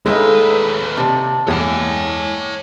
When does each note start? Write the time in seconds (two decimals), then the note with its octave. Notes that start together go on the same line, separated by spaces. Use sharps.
0.06 D#2 A2 G#3 D#4 B4 F5 E6
0.97 C3 D5 A5
1.48 E2 G#3 C#5 G5 G#5 D6